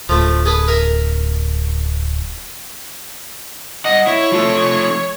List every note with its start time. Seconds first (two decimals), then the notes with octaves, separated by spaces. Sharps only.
0.09 D1 F3 A3
0.46 G#4 A4 B4
0.68 A#4 E5 G#5
3.85 G2 D#5 F#5
4.07 E4 C#5
4.32 F3 A3